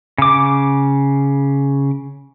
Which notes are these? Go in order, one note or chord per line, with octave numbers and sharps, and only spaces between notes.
C#3 D6